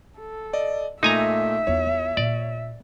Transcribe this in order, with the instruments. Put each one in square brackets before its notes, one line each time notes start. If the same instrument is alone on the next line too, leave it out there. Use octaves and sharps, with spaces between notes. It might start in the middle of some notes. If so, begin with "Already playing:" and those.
[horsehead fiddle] A4
[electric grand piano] D5 D#5
[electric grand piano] A#2 A3 [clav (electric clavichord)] D#4 G#5 A#5 [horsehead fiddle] E5
[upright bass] E2 F4 [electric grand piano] C#5
[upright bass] A#2 [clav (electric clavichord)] D5